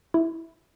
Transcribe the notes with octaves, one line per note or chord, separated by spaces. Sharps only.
E4